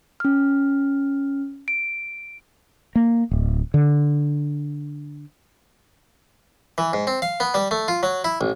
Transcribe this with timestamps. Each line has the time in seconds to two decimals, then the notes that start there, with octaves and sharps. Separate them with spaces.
0.20 C#4 F6
1.68 D7
2.95 A#3
3.31 D1
3.74 D3
6.78 E3
6.93 G#2
7.07 C4
7.22 F5
7.40 B3
7.54 G3
7.71 A3
7.88 F4
8.03 F#3
8.24 E4
8.41 A1